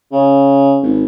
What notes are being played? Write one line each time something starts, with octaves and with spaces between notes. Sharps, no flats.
C#3
G#1